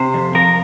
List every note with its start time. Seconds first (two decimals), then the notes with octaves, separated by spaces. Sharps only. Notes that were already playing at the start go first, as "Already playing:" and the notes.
Already playing: C3 C5
0.14 F2
0.35 F3 A#4